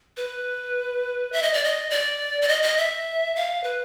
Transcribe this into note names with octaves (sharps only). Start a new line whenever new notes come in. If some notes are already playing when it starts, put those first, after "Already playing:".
B4
E5
D#5
D5
D#5
D5
D5
D#5
D#5
E5
F5
B4